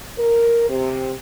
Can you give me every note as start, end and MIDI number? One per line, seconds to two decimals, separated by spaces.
0.17 0.65 70
0.69 1.12 48